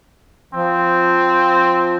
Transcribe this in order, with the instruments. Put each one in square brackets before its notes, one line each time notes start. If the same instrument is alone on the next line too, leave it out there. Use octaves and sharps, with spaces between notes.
[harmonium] F3 [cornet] C4